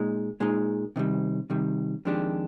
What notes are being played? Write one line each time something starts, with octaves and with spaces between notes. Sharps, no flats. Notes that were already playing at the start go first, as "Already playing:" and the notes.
Already playing: A#2 G#3 D#4
A#2 G#3 D#4
C3 D#3 G3
C3 D#3 G3
F2 D#3 G#3 D4 G4